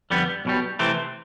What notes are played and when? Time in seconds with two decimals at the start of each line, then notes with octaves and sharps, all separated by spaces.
0.10 F2 D3 G3 B3
0.45 B1 B2 G3
0.79 C3 E3 A3 C4